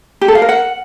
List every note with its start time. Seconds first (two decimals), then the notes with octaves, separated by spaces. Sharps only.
0.21 G4
0.28 A4
0.35 F5
0.42 A#4
0.49 F#5